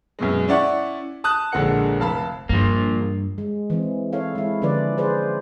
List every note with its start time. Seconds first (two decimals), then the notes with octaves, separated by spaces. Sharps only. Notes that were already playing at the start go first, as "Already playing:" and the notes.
0.19 F#2 B2 G#3
0.48 C#4 E4 D5 F#5 C#6
1.24 A5 D#6 F#6
1.52 A#1 D3 G#3 A#3 F#5 C#7
2.00 F1 F5 A5 B5
2.49 G2 F3 A#3
3.38 G#3
3.70 E3 C4
4.13 E4 A4 C#5 F5
4.35 G#3 E4
4.61 D3 F3 C#4 F4 B4 D5
4.98 G#4 B4 C5 D5